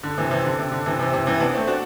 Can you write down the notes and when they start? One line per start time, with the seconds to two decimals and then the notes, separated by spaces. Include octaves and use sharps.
0.03 D3
0.18 C3 E3
0.31 C3 E3
0.45 D3
0.59 C3
0.72 D3
0.86 C3 E3
0.99 C3 E3
1.13 C3 E3
1.27 C3 E3
1.40 B3 D4
1.54 A3 C4
1.67 D4 F#4